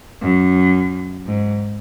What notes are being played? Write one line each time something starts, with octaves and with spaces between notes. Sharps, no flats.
F#2
G#2